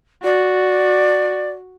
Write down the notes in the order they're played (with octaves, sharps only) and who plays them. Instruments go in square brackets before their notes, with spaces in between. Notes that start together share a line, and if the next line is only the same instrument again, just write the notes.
[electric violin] F#4 [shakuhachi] D5